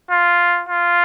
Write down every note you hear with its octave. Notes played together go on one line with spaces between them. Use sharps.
F4
F4